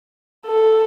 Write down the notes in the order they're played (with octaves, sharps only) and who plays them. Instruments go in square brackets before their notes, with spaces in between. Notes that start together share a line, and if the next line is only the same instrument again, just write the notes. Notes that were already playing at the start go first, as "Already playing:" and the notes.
[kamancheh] A4